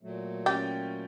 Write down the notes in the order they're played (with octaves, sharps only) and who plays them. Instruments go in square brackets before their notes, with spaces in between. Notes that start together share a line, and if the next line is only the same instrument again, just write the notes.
[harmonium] A#2 F#3 A3
[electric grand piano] C#4 G5 A6 [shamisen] G4